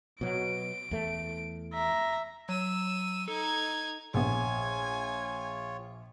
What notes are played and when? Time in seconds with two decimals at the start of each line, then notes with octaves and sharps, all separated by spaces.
0.21 B2 F#3 D7
0.91 E2 A3
1.73 E5 A#5
2.49 F#3 E6 D#7
3.28 D#4 A4 G#6
4.14 A#1 C3 B3 F4 C#5 G#5